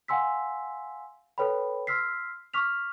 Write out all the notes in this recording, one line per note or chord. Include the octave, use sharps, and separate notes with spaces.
F5 F#5 G#5 C6 E6 B6
A4 B4 C#5 G5 B5
C6 E6 F6 B6 C7
C#6 D6 F6 B6 F7